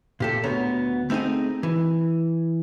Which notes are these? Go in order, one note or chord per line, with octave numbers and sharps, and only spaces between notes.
A#2 G4 A4
D2 B3 C#5 A#5
A3 C4 D#4 G#4 D#5
E3